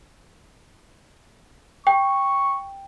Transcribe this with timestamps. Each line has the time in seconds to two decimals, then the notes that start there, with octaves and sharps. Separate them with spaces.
1.87 G5 C#6